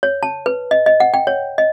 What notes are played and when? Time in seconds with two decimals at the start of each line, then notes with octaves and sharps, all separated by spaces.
0.03 C#5
0.23 A5
0.46 B4
0.71 D#5
0.86 D#5
1.00 F#5
1.14 G5
1.27 C#5
1.58 D#5